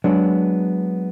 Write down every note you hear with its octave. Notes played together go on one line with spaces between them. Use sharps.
F#3 G#3 B3 D4 C#5